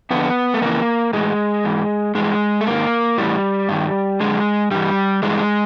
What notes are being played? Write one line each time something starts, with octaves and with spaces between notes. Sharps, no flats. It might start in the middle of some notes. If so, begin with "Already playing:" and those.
F2 D3 B3
A3
F2 C#3 E3 A#3
A2 E3 G#3
G#2 E3
G2 E3 G#3
A3
G#2 D#3 A#3
A2 E3 G3
G2 D#3
F#2 D3 G#3
G2 E3 G3
G2 E3 G#3